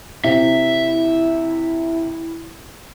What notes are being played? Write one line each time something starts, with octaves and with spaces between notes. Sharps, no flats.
C3 E4 E5